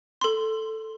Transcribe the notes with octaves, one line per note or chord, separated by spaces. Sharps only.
A4 C6